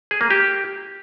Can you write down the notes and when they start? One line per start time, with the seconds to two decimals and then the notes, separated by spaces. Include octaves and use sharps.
0.11 G#4
0.21 A#3
0.31 G4